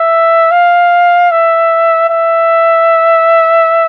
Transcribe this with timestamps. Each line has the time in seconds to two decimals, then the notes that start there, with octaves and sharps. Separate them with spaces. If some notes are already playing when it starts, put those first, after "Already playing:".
Already playing: E5
0.51 F5
1.31 E5
2.09 E5